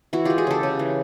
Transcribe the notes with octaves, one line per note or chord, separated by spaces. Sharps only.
E3 E4 F#4
G#3 F4 G4
F#4 G#4
C#3 G4 A4
C#3
E3